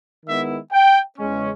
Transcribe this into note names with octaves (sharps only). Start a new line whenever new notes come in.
D#3 G#3 B3 E4 E5
G5
E2 C#3 G#3 C#4